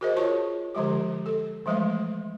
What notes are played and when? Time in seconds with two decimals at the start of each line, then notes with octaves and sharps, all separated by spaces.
0.01 F#4 G#4 A#4 C5 D#5
0.17 F4 G#4 C#5 A5 C#6
0.75 D3 F3 G#3 G4
1.26 A4
1.66 E3 F3 G#3 A3 F5